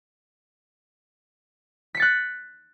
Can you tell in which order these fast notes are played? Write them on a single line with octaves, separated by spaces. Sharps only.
B6 C#7 A6 F#6